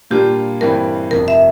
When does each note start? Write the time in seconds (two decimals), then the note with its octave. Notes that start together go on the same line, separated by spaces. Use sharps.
0.10 A#2 G3 A#3 D4 F4 G4
0.61 G2 E3 G3 C4 A#4
1.11 F1 F2 C3 F3 A#4
1.28 E5